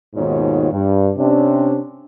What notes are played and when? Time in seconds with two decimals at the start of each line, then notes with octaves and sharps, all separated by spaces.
0.15 D#2 G#2 B2 D#3 F4 C#5
0.71 G2
1.17 C3 C#4 D4